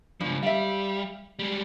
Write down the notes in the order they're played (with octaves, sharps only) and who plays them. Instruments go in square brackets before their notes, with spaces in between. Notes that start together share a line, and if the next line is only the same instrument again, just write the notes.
[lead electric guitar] C#2 F3 [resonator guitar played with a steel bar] G2
[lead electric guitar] G3 [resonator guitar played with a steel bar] E5 F5
[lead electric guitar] G3 G#3